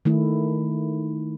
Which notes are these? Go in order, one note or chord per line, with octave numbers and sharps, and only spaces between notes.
D#3 A3 E4